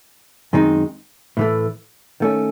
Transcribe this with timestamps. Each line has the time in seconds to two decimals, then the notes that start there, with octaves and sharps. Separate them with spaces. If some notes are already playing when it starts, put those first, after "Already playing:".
0.53 F#2 D#3 G#3 C4 D#4
1.37 A2 E3 A3
2.20 D#3 A3 C#4